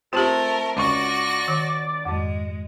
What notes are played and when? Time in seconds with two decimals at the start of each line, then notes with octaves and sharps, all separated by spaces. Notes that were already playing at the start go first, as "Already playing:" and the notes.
0.13 A3 C4 F4 G4 A4 A#4
0.76 C#2 F#4 D5 C#6 A#6
1.48 D#3
2.05 F2 G#2 G#3